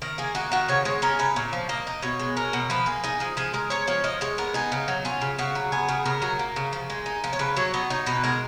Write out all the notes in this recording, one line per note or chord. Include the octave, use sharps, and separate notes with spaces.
D#3 A#4
A#3 G#4
D#4 F#4
D#3 F#4
C#3 C#5
G#3 C#5
C#4 A#4
C#3 B4
A#2 C#5
F3
A#3 D#5
D#4
B2 C#5
G#3
C#4 A#4
B2
F3 B4
A#3 G#4
D#4 G#4
F3 G#4
F3 G#4
G#3 A#4
C#4 C#5
F3 C#5
F3 D#5
G#3 C#5
B3 A#4
D#4 G#4
C#3
F#3
C#4 F4
C#3
C#3 F#4
F#3
B3 G#4
C#3
C#3 A#4
F#3
A#3
C#3
F3
G#3
D#4
F3
C#5
C#3 B4
F#3 C#5
B3 D#5
D#4 C#5
B2 B4
G#3 A#4